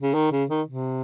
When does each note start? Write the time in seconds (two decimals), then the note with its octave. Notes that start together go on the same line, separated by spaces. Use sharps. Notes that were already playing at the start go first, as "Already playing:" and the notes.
0.02 C#3
0.14 D#3
0.32 C#3
0.49 D#3
0.67 C3